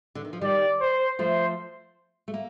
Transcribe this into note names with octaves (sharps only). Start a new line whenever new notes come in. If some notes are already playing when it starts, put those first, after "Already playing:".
D3
D#3
F3
D#3 G3 D5
C5
F3 A3 C5
A3
A#3